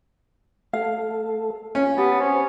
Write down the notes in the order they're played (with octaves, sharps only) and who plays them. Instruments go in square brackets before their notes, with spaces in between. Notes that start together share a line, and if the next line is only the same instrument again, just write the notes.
[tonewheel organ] A3 A4 [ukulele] F5
[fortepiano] C#4 [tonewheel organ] F4
[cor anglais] B3 [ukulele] G4 [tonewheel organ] A5
[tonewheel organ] C4 C5 [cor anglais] C#4